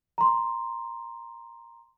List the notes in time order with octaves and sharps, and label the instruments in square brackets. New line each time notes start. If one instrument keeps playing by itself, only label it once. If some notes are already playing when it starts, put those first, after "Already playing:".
[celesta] A#5 C6